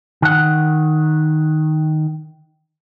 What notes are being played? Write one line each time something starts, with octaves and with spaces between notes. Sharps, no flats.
D#3 F#5